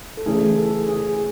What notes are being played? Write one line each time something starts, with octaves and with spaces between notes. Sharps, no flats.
A4
C#3 E3 A3 C#4 G#4
A4
G#4